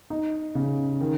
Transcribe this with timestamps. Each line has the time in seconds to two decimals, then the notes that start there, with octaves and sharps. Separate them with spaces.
0.10 D#4
0.55 C#3
1.00 D#3